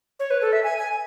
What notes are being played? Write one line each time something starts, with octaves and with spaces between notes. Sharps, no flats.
C#5
B4
A4
E5
G#5
G#5